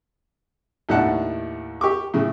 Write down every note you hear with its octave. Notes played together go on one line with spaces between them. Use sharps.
D#2 A2 D4 F#5 A5
G4 C#6 D6
A2 C#3